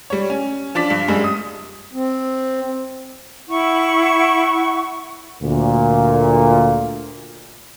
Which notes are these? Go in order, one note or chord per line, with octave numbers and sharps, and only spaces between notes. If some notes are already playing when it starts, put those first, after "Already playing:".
G3 C#5
C#4
F3 D4 D5 B6
G2
F#2 G3 G#3
D#6
C4
E4 F#5 C#6
D2 A#2